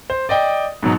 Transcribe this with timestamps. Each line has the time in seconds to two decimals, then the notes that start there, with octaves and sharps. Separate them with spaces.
0.10 C5
0.29 D5 D#5 G5
0.83 G#2 B2 F#3